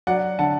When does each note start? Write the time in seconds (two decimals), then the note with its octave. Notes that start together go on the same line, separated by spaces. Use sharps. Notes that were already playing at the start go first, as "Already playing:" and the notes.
0.07 F#3 D5 F#5
0.39 D3 F#5 A5